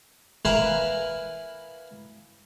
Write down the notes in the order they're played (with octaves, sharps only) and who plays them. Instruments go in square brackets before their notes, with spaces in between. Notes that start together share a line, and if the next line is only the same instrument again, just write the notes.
[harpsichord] E4 A#4 B4 F5 G#5